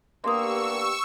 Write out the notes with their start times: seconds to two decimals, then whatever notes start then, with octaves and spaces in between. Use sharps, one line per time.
0.24 A#3 B3 D4 G4 C6 C#6 D#6 E6